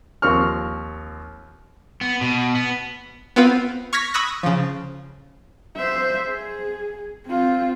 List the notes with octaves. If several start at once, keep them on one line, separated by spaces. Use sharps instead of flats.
D#2 F3 C4 A#4 C#6 F6
B3
B2
B3
B3 C4 F4 B4
C#6 F6 G#6 A#6 B6 C#7
B5 C#6 D#6 E6 F#6 A#6
C#3 F3
C5 E5
G#4
C4 F4